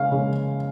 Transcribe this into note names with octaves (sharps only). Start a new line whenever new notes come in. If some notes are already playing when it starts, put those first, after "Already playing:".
Already playing: C#3 G#3 C#4 F5
C#3 G#3 C#4